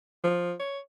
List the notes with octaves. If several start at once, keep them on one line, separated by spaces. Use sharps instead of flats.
F3
C#5